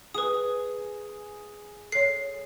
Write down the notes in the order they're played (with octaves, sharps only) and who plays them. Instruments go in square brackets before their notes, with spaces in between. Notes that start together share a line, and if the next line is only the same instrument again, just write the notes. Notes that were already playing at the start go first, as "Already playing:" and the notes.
[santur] G#4 [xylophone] B4 D#6
[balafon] A4 C#5 [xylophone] C7